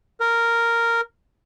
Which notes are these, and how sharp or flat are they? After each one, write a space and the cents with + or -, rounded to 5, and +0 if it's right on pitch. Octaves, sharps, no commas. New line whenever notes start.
A#4 -5